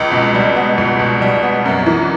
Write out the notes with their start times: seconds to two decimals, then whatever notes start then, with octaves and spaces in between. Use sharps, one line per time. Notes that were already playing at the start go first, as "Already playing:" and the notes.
Already playing: C#2
0.11 B2
0.34 G3
0.56 B3
0.78 C#2
0.99 B2
1.22 G3
1.43 B3
1.66 F#2
1.86 E3